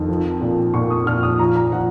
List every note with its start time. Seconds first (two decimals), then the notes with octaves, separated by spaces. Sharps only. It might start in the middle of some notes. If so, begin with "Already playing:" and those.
Already playing: F2 D#3
0.09 F3
0.41 A#2
0.74 A#2 C#6
0.90 D#6
1.06 A#2 F6
1.23 D#6
1.39 F3 A#5
1.56 A#5
1.72 F3 F#5